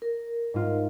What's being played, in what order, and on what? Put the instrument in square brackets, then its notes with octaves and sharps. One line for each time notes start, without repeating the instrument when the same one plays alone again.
[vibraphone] A#4
[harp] G#2 F4